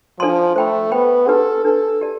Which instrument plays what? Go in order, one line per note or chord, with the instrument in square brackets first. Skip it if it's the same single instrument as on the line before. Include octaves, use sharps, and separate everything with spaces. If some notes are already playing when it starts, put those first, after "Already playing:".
[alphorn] F3 [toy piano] D4 A4 D5 A5 C6
[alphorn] A3 [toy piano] C5 G5 B5
[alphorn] B3 [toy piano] C5 G5 B5
[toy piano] D4 G4 B4 [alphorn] A4
[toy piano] D4 G4 B4 [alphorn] A4
[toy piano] G4 D5 A5